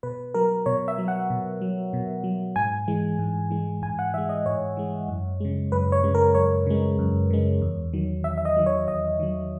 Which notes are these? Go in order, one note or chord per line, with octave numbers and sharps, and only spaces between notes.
B2 B4
F#3 A#4
B2 C#5
E5
F#3
F#5
B2
F#3
B2
F#3
G#2 G#5
E3 G#3
G#2
E3 G#3
G#2 G#5
F#5
E3 G#3 E5
D#5
G#2 C#5
E3 G#3
F#2
C#3 G#3
F#2 B4
C#5
C#3 G#3
A#4
F#2 C#5
C#3 G#3
F#2
C#3 G#3
E2
D#3 F#3
E2 E5
E5
D#5
D#3 F#3
C#5
E2 D#5
D#3 F#3